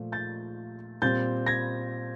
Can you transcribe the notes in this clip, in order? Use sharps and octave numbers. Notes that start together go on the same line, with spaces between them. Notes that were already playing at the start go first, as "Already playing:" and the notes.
Already playing: A#2 F3 A3
G6 A6
A#2 G3 C4 G6 A6
G#6 A#6